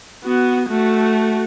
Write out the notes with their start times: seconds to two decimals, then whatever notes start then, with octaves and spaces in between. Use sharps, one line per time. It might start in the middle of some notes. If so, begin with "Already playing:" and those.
0.24 B3 F#4
0.68 A3 F#4